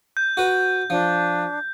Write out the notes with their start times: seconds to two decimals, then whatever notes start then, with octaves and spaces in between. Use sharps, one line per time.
0.17 G6
0.37 F#4 B4
0.90 F3 D4